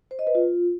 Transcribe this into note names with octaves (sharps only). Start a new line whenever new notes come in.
C5
D#5
B4
F4